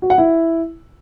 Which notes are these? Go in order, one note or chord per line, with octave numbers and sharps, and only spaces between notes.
F#4
F#5
E4